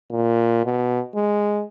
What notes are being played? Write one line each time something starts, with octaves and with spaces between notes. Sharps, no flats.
A#2
B2
G#3